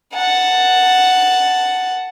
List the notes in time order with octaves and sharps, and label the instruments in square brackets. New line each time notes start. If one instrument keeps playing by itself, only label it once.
[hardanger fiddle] F#5 A5